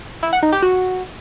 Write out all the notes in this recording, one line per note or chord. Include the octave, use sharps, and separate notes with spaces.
E4
F#5
D#4
G4
F#4